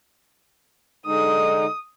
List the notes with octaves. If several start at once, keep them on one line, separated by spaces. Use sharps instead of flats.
D3 G#3 D#4 D#6